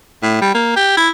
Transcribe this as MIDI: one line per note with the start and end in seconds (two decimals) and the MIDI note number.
0.22 0.39 45
0.41 0.53 55
0.54 0.76 58
0.76 0.92 67
0.97 1.09 64